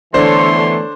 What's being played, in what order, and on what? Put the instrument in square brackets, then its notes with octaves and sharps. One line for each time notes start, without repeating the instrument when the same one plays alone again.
[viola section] D3 C#5 [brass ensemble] E3 A3 B3 [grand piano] D4 C5 [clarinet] C6